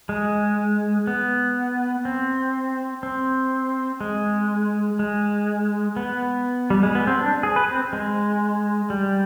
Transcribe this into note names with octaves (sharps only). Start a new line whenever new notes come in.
G#3
B3
C4
C4
G#3
G#3
B3
G3
G#3
B3
C4
D4
G#4
B4
C4
G#3
G3